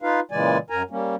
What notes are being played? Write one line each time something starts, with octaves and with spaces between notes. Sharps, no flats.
D#4 F4 B4 F5
A#2 C#3 E3 G#3 D5 G#5
F#2 A#4 G#5 A#5
G3 A#3 C#4